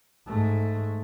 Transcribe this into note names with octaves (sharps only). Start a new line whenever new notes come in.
G#2 A3